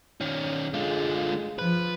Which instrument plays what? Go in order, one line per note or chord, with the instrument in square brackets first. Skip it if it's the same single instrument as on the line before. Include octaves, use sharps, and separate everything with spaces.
[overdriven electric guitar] D#3 C#4
[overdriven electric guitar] D3 F4 [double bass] G#3
[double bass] F3 [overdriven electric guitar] B4